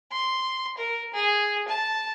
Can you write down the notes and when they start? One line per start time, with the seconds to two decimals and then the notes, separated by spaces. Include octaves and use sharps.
0.13 C6
0.78 A#4
1.14 G#4
1.68 A5